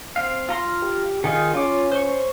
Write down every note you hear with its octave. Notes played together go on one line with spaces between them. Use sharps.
C4 F5
F4 A#5 C6
G4
D#3 D#4 F4 G#4
C#4 F4 D6
C5 C#6